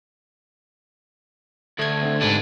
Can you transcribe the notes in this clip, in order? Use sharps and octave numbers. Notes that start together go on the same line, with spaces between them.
D2 A3 G#6
D3 C4
G#2 C3 D4 B4